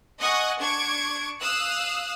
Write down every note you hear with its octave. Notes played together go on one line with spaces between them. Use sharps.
D#5 F#5 G#5 C#6 D#6
D4 C#6 G#6 D7
F5 D#6 E6 F#6